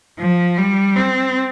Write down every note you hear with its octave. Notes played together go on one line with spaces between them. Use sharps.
F3
G3
C4